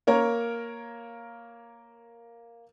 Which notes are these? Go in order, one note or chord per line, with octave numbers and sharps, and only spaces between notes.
A#3 A#4 C#5 A#5